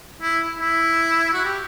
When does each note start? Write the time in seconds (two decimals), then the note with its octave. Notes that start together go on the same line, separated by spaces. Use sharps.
0.22 E4
0.59 E4
1.33 F#4
1.45 G4